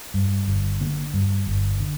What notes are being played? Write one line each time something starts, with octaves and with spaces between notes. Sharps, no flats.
G2
G1
D3 A#3
G2
G1
D3